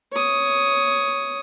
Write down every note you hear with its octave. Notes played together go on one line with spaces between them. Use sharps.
C#5 D#6